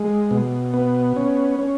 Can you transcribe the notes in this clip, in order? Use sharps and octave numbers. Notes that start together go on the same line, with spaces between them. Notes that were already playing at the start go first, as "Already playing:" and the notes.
Already playing: G#3
B2
B3
C#4
C#4